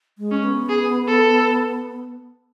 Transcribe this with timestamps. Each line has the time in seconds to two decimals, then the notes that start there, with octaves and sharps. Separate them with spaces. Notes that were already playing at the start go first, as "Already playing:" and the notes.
0.18 G#3
0.31 C#4
0.44 B3
0.69 G#4
1.08 A4